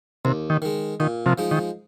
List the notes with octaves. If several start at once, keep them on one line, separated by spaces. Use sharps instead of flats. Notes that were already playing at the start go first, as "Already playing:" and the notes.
D#2 C3
D#3
D#3 G#3
A#2 D#3
C3 F3
F3 G#3 D#4
D#3